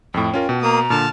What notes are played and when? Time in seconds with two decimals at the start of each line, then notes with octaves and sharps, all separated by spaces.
0.14 F2 A2 G5
0.34 C#4 F4 A#4
0.49 B2
0.62 A#3 A#5 D#6
0.90 A#2 D3 A5 F6